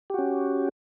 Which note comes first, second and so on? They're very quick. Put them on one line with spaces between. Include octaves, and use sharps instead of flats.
G4 F#4 C#4